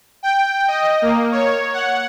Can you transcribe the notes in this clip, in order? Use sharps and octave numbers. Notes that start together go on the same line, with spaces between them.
G5
D#5
A#3
C#5
F#5